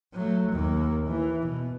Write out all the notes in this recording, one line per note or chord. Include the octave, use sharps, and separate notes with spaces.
F#3 A3
D#2 A#3
E3
B2